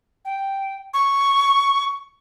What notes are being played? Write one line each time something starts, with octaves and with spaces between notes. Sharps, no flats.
G5
C#6